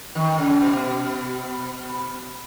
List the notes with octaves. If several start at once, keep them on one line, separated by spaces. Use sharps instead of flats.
D#3
C#3
B2